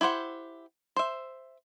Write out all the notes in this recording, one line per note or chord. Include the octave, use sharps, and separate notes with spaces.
E4 G4 C5 F#5
C5 E5